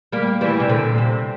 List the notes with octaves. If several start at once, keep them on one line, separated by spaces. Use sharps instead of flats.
G3 A#3
E3 G3
C3
A#2 D3
C3